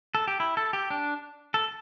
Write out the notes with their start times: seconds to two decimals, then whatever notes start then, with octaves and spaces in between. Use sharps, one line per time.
0.15 A4
0.28 G4
0.40 E4
0.57 A4
0.73 G4
0.90 D4
1.54 A4